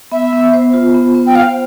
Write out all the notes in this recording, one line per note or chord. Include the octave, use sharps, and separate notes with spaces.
B3 E5
B3
C5
F4
B3
B3
G5
C5 F5